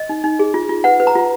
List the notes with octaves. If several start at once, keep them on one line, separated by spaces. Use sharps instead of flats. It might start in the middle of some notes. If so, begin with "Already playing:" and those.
Already playing: D#5
D#4
D#4
G#4
F4
F4
B4 F#5
B4
A#5
F4